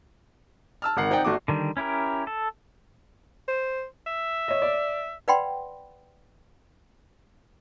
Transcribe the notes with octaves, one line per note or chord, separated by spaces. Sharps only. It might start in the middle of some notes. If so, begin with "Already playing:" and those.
A5 E6 F6
G#1 D#3 A#4 F#5 C7
C4 D#4 D5 F#5 G5
G1 A3 F#4 D6
D3 D#3 G3
C#4 E4 G4 A#4
A4
C5
E5
C#5 D#5
D5
B4 D5 F#5 G5 B5 C6